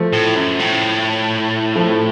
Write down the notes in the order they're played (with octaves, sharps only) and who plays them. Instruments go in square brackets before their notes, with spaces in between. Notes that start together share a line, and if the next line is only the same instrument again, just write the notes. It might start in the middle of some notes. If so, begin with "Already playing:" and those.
Already playing: [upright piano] F3 A3
[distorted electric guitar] A2
F#2
A2
[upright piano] F3 A3